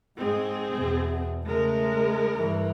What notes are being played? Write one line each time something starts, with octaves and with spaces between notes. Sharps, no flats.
G#2 G#3 C4 G#4
E2 B2
C#3 G#3 A3 A#4
G2 E3